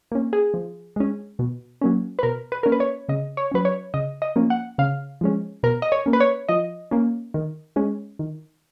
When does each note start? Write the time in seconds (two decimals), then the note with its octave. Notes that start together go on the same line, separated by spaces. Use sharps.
0.12 A#3 C#4
0.33 G#4
0.54 F3
0.96 G#3 C#4
1.39 B2
1.81 F#3 A#3 C#4
2.19 B4
2.23 B2 A#4
2.52 B4
2.63 A#3 C#4 A#4
2.72 B4
2.80 C#5
3.09 C#3 D#5
3.37 C#5
3.51 F#3 C#4 B4
3.65 C#5
3.94 C#3 D#5
4.22 D#5
4.36 F3 A#3 C#4
4.50 F#5
4.78 C#3 F5
5.21 F3 G#3 C#4
5.63 B2 A#4
5.82 D#5
5.92 C#5
6.06 A#3 C#4
6.13 B4
6.20 C#5
6.49 F3 D#5
6.91 A#3 C#4
7.34 D#3
7.76 G#3 C#4
8.19 D#3